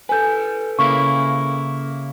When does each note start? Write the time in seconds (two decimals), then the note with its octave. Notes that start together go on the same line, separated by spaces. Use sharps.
0.09 A4 B4 G#5 G6
0.79 C#3 A#3 E4 C#6